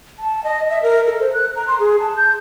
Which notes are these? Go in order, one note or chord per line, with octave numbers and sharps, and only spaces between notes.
A5
D#5
E5
A#4
A4
C5
F#6
A#5
C6
G#4
A5
G6